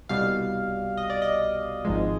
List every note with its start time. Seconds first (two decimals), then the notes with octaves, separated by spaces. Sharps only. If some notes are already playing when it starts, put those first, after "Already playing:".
0.09 C2 B2 G3 F5
0.97 D#5
1.10 D5
1.22 D#5
1.85 G#1 G#2 F3 G#3